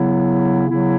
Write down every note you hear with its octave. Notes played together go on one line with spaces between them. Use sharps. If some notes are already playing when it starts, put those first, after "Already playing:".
Already playing: C#3 F#3 B3 E4
C#3 F#3 B3 E4